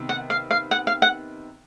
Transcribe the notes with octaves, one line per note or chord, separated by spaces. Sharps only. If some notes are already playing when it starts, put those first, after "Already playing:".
Already playing: C3 D#3 B3
F#5
F5
F5
F#5
F5
F#5